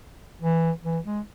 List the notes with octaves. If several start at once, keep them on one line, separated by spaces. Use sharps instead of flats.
E3
E3
G#3